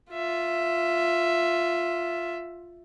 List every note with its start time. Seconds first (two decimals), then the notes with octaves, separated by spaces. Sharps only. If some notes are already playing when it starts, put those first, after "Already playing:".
0.11 F4 E5